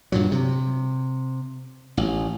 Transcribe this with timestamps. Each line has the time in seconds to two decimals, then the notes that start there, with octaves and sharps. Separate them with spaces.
0.12 G2 A#2 F#3
0.32 C3
1.97 A1